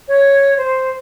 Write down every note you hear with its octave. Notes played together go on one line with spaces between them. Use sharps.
C#5
C5